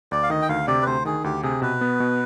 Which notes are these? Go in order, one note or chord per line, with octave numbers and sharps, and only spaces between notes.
D2 D5
F5
D#3 D#5
G5
D2 F5
C3 D5
B4
D2 C5
D#3 G#4
D2 G4
C3 G#4
B2 B4
B3
B2